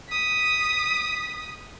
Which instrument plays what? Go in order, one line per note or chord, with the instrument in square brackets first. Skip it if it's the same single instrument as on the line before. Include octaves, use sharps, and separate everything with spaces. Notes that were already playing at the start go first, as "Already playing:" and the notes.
[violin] D#6 B6